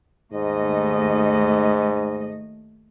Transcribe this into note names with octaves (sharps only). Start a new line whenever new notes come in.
D#2 G#2 A3 D#5